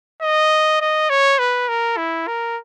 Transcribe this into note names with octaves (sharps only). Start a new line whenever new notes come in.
D#5
D#5
C#5
B4
A#4
E4
A#4